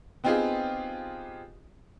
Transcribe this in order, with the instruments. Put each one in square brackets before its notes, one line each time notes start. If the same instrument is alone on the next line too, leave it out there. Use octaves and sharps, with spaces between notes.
[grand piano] B3 C4 D#4 F4 G4 G#4